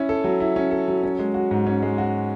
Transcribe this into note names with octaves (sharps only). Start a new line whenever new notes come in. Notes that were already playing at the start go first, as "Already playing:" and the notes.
Already playing: C#4 E4
A4
F#3
E4
C#4
A4
F#3
C#4
G#3
F#4
G#2
C#4
G#3
F#4